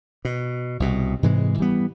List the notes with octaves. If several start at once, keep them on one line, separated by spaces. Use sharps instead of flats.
B2
C2 B2
G#2 C3 E3 G#3
E3 G3 B3